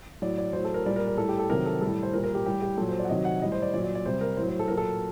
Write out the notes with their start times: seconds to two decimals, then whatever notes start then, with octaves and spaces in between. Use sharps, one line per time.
0.22 A2 F#3 D5
0.38 D5
0.53 A2 F#3 C5
0.64 A4
0.74 A#4
0.86 A#2 G3 D5
0.96 A#4
1.07 A#4
1.17 A2 G3 A4
1.29 G4
1.39 A4
1.50 C3 D#3 F#3 A#4
1.66 A4
1.81 A2 G3 A4
2.03 C5
2.13 A#2 A#4
2.18 G3
2.24 A#4
2.35 G4
2.46 A2 G3 G4
2.62 G4
2.77 A#2 F#3 A4
2.89 C5
2.99 D5
3.05 F#5
3.09 C3 D#3 F#3 D#5
3.25 F#5
3.42 A2 G3 D#5
3.52 C5
3.62 D5
3.74 A#2 F#3 D5
3.84 D5
3.95 D5
4.06 C3 G3 C5
4.21 A#4
4.37 A2 C5
4.42 F#3
4.48 C5
4.59 A4
4.68 A#2 F#3 A#4
4.77 A4